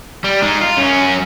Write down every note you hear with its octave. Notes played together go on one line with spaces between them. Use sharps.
G3
G#3 D#4
F4
F#2 C#4